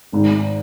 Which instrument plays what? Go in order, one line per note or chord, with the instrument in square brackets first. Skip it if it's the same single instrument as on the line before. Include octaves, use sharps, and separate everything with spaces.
[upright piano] G#1 G#2 D#3